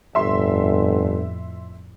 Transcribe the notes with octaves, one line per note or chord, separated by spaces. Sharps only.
G1 F2 A2 E5 C6